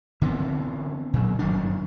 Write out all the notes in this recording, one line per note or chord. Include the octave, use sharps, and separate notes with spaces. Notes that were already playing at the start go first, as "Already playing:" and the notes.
D3 E3 B3 C4
A#2 F#3
G1 F#2 D#3 D4